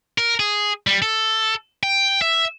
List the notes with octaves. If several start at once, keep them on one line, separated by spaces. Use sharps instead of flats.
A#4
G#4
G3
A4
G5
E5